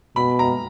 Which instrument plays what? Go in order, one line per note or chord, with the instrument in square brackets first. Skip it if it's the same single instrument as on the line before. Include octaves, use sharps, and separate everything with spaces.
[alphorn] B2 [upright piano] B5
[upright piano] A#5